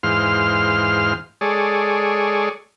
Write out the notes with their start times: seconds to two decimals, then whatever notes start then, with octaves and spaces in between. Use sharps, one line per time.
0.03 E2 G#2 C5 F5 C6 F6
1.41 G#3 G#4 A4 C#5 D5